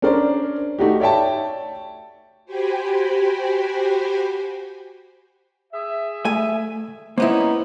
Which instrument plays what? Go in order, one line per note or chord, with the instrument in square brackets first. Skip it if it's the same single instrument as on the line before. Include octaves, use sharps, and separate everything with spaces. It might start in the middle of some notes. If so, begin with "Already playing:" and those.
[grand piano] C#4 D4 A#4 C5 D5
A3 D#4 F#4 G4
C#5 D5 E5 G5 A5
[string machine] F#4 G4 C5 G5 G#5 B5
[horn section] G#4 E5
[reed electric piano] A3 [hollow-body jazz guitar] G#5
[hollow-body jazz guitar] A#3 B3 E4 [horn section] C#4 D#4 [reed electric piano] C5